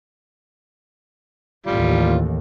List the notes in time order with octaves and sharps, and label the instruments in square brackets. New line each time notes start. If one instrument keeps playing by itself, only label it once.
[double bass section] A1 D#2 [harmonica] G3 F4